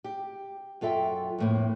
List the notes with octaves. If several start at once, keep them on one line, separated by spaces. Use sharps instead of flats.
G4
F#2 F4 A4 E5 G5
F2 A2 A#3